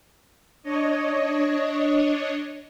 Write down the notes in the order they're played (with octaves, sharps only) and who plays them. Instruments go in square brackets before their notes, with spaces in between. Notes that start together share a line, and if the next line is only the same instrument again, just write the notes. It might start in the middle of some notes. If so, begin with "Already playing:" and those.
[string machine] D4 C#5 D#5